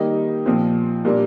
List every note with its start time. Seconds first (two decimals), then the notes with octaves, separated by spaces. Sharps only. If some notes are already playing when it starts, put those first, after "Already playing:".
Already playing: D#3 G3 A#3 D#4
0.46 A#2 F3 C4
1.05 A#2 G3 A#3 D4